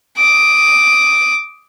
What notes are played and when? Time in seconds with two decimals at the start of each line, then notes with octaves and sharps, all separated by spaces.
0.17 D6 D#6